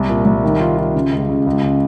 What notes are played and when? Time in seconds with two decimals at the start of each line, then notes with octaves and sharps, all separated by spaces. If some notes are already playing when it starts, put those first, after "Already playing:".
Already playing: C2
0.09 A#2
0.25 C2
0.44 D#3
0.60 F4
0.78 F4
0.94 C#3
1.12 C#2
1.29 C#3
1.47 C#2
1.63 C#3